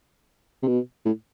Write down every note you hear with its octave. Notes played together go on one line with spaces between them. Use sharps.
C3
B2
A2